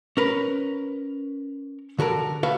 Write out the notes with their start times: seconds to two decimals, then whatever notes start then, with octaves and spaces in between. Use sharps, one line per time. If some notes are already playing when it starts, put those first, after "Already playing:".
0.17 C#4 A#4 B4
1.99 D3 F#4 A4 A#4
2.43 D2 F#4 B4 E5 F5